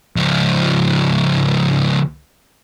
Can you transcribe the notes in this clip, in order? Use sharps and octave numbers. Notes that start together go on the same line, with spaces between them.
C#2 F3